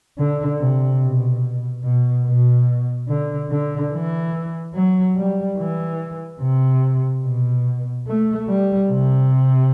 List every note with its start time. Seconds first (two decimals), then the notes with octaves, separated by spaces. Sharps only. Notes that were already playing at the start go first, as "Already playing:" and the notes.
0.18 D3
0.60 C3
1.01 B2
1.84 B2
2.26 B2
3.09 D3
3.51 D3
3.92 E3
4.75 F#3
5.16 G3
5.57 E3
6.41 C3
7.24 B2
8.07 A3
8.49 G3
8.90 C3